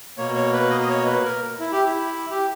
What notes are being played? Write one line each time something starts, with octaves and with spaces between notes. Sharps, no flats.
B2 A#3 C#5
C#5
B4
D#5
D#5
C#5
B4
A#4
E4
G4
E4
G4